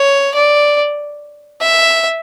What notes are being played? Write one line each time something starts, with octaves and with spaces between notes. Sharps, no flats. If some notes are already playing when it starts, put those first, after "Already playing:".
Already playing: C#5
D5
E5